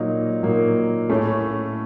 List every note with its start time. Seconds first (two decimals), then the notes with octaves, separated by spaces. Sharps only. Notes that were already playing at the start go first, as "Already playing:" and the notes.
Already playing: A#2 F#3 A#3 D#4
0.43 A#2 F#3 A#3 D#4
1.09 A2 A3 C#4